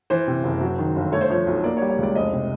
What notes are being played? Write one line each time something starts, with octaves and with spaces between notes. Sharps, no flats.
E3 C5
C3
F#1
F#3
D#3
G1
A3 C#5
C5
F3 C#5
B1
A#3 D5
C#5
G3
C#5
C#2 D5
F1 D#5
C3